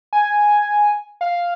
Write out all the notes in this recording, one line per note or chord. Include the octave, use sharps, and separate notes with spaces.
G#5
F5